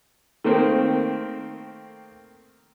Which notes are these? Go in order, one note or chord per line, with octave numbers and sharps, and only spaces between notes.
D#3 A3 A#3 C4 A#4 C5